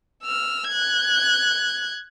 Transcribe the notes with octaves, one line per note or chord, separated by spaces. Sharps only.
E6 F6
F#6 G#6